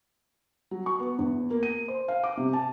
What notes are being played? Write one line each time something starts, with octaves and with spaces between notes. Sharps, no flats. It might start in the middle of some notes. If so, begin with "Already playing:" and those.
F#3
C#6
B3
E2
A#3
D#7
C5
F5
D6
C3
A5